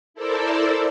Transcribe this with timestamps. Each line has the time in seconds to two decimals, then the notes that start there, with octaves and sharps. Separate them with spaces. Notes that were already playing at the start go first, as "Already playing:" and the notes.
0.14 E4 A4 A#4 C5 D5 E5